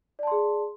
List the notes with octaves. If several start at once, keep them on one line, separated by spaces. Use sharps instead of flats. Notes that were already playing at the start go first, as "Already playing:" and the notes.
G#4 D5 A5 C6